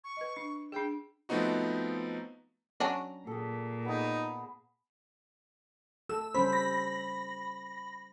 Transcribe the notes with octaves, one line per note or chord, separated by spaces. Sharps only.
C#6
B4 D#5
D4
D4 G#4 G5
F3 A3 B3 C4 D#4 F#4
F#3 C#4 D4 A#5
A#2 G#4 A4
B3 D#4 G#4
A4 E6
G3 C#4 C5 B5
B5 A#6